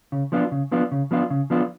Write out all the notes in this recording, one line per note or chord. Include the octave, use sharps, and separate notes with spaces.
C#3
F3 B3 D4 F4
C#3
F3 B3 D4 F4
C#3
F3 B3 D4 F4
C#3
F3 B3 D4 F4